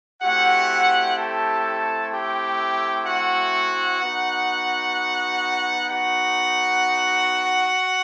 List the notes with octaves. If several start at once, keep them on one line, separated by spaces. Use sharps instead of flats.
A3 C4 E4 F#4 G4 F#5
A4 A5
G4 G5
F#4 F#5
B3 D#4 F#4
F#4 F#5